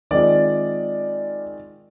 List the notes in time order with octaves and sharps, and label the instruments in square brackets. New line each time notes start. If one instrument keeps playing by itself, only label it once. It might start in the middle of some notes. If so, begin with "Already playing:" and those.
[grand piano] D#3 G#3 C4 F4 D5